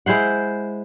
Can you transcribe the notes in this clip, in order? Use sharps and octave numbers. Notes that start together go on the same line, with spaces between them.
G#3 E4 C5 F#5